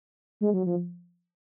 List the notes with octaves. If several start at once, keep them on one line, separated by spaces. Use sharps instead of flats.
G#3
F#3
F3